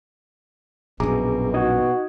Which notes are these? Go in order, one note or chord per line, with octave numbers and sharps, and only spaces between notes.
A#1 F#2 B2 G#4 A#5 D6
D#4 F#4 D#5 G#6